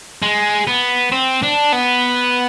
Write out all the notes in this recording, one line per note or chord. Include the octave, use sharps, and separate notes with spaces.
G#3
B3
C4
D4
B3